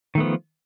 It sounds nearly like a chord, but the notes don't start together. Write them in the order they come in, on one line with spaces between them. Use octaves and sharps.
D#3 A3 B3 F3